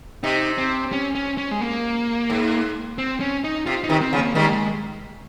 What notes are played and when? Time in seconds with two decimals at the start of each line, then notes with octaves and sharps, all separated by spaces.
0.23 C3 D#4
0.58 C4
0.92 C#4
1.15 C#4
1.38 C#4
1.51 G#3
1.61 A#3
2.30 G#2
2.98 C4
3.20 C#4
3.44 D#4
3.66 C3 F4
3.84 D#4
3.89 C3 D#3
4.01 C4
4.13 C#3 F3
4.18 A#3
4.35 D#3 G3 G#3
4.53 G#3